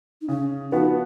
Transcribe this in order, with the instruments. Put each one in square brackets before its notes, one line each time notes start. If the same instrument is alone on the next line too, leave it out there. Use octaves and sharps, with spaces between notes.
[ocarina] D#4
[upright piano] C#3 [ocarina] C#4
[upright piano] F3 B3 F#4 [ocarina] D#4